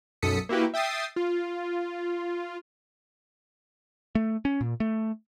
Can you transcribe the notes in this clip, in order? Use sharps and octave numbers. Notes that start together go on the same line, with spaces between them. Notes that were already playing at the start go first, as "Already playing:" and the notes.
B1 F#2 A4 D#6 B6 C#7
A#3 E4 F#4 G4 B4
E5 G5 D#6 A6 C7
F4
A3
C#4
A#2
A3